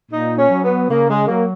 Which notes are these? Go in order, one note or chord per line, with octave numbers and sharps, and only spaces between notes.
A#2 D#4
C#4
F#3
B3
C#3 A#3
G#3
F#3 A#3